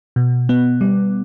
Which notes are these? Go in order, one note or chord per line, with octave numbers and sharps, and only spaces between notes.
B2
B3
G3